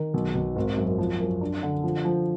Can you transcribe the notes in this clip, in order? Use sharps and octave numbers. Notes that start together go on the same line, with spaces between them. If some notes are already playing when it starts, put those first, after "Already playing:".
Already playing: D#3
B1
B1
G#1
F#2
F3
F#2
D4
D3
F3
F3